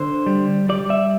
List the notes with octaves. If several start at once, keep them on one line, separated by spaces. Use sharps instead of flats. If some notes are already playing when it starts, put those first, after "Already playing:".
Already playing: D3 C5
G3
G3 D5
E5